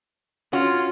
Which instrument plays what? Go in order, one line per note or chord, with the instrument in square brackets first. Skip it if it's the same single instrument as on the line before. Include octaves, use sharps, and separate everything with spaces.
[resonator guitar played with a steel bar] C#4 F#4 [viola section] F4